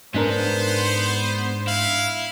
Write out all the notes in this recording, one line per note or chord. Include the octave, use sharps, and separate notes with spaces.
G#2 B3 D4 A#4 C5
E4 F5